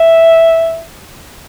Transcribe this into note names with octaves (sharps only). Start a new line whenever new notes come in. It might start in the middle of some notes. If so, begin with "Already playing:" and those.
Already playing: E5